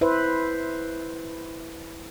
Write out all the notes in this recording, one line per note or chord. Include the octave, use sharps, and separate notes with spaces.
E4 B4 C5 E5